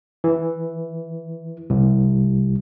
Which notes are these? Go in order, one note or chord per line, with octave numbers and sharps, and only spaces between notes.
E3
C2